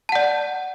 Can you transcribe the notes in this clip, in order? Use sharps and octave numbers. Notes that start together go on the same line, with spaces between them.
D5 F#5 A5